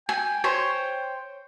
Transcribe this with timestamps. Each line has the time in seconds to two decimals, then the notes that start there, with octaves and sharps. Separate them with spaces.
0.09 G5 G#5
0.44 C5 C#5